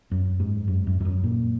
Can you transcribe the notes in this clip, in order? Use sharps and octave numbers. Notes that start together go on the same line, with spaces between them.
F#2
G#2
F#2
F#2
F2
F#2
A#2